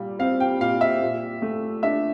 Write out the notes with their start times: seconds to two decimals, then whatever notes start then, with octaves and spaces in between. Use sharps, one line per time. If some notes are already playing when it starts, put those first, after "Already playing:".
Already playing: A#2 G3
0.19 C4 F5
0.40 G5
0.61 A#2 F5
0.81 E5
1.02 A#2
1.42 A3
1.83 D4 E5